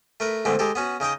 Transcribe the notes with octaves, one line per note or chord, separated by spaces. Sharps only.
A3 A#4 B4
E2 G#2 D3 A3 C4
G#3 G4 A4
B3 C#4 F#4
C#3 D#4 D#5 G5